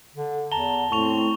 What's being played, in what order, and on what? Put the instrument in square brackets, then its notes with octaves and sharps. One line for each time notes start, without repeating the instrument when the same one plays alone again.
[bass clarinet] D3
[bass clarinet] E2 [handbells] A5 A#5 [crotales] G7
[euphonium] A2 [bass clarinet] C4 [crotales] C#6 F7